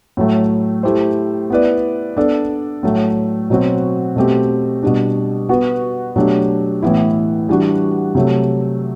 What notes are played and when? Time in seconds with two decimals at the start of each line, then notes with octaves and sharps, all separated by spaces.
0.17 A2 F#3 A3
0.83 A3 E4 G4 C5
1.50 B3 E4 B4 D5
2.17 B3 D4 A4 D5
2.83 A2 F#3 A3
3.50 B2 F#3 C4 F#4
4.16 B2 A3 C4 G4
4.83 B2 G3 D4
5.49 B3 F#4 B4
6.16 B2 F#3 A3 D4 G4
6.82 A2 E3 B3 E4
7.49 E3 G3 D4 F#4
8.15 C3 F#3 A3